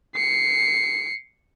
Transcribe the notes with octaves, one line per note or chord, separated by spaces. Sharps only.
C7 C#7